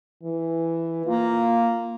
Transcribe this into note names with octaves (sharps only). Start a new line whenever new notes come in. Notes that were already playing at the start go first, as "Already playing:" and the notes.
E3
A#3 F4